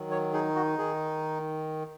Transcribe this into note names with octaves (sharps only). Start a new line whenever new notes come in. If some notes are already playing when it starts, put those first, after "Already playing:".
Already playing: D#3 F#3
C#5
D#4 G#4
F#4
D#3 G#4